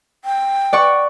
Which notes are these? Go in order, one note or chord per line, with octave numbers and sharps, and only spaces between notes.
G5
D5 F#5 C#6